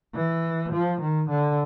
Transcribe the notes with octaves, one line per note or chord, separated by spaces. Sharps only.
E3
F3
D#3
D3